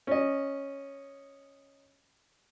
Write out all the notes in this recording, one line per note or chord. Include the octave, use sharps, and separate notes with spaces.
C#4 D#5